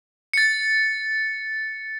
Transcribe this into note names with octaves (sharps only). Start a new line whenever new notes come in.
A6 C#7